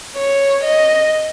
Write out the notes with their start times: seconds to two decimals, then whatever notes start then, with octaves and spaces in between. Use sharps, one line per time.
0.17 C#5
0.64 D#5